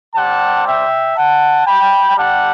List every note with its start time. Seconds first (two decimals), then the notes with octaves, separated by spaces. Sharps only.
0.15 G3 C4 G4 F#5 A5
0.65 E5 G5
1.16 F#5 A5
1.66 G5 B5
2.16 G3 D4 G4 F#5 A5